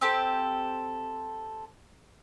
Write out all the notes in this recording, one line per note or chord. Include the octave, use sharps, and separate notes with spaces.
C4 G4 A4